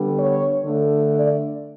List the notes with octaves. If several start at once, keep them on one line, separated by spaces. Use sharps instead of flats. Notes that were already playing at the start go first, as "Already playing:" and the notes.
Already playing: D3 G3 B3
C#5
D3 A3
D5